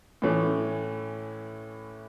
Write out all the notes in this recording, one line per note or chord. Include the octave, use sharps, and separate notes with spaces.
A2 E3 A3 C#4